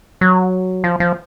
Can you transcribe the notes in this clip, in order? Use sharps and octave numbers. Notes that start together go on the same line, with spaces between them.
F#3
F3
F3